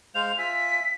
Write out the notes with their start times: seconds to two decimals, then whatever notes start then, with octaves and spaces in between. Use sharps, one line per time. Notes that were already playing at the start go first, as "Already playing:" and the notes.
0.15 G#3 C5 F5 F7
0.38 F4 E5 G#5 B6